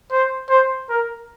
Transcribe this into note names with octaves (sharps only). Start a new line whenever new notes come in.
C5
C5
A#4